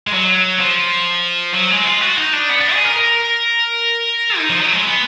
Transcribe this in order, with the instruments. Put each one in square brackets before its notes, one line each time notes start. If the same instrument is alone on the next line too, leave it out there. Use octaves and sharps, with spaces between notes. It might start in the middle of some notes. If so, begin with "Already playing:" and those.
[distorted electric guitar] G#3
F#3
F3
F#3
G#3
F4
F#4
D#4
D4
B3
D4
G#4
A#4
A#4
D#4
F3
F#3
G#3
B3